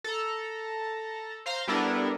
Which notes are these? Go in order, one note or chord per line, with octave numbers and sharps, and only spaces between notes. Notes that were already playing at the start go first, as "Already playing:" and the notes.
A4 A#5
C5 F5 A#5 C6
G3 B3 D4 E4 A4 A#4